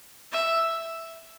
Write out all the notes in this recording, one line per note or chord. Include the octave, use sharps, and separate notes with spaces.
E5